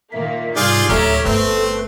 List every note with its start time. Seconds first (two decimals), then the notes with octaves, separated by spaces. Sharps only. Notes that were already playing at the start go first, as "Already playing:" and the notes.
0.12 A#2 D#3 A#3 E5
0.57 G#2 C3 G3 F4 G#4 D5 G6
0.89 D1 D2 G4 A4 C#5 E5 A#5 F6
1.26 G1 A3 C4 B4